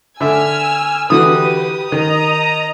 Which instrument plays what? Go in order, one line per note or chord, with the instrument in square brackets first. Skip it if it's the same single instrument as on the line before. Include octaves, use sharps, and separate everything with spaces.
[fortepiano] D3 E5 [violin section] G#5 E6 F6
[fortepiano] D3 E3 F#4 [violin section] G4 B4 [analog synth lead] D#6
[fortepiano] D#3 [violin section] D#5 A#5